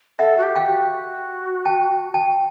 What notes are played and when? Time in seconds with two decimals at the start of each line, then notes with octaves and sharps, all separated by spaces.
0.19 A4 E5 F#5
0.37 F#4
0.43 G4
0.55 F5 G5
0.68 F#4
1.65 G5 A5
2.14 G5 A5